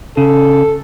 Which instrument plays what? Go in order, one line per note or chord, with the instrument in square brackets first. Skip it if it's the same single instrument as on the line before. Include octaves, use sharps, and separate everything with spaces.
[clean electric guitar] C#3 [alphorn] A4